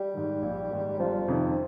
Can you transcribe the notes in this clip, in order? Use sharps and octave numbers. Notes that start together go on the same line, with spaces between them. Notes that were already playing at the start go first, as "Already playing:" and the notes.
Already playing: G3
G#2 D#3
A#1
G#2 D#3
G1 F3
F2 C3 D#3